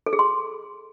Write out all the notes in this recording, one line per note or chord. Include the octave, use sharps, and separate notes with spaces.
A4
G#4
C6